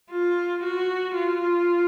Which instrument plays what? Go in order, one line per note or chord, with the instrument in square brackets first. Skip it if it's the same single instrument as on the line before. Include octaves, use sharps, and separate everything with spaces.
[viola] F4
F#4
F4